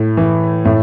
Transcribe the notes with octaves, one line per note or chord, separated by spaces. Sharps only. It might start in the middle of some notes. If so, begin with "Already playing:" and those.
Already playing: A2 A3
E3
A2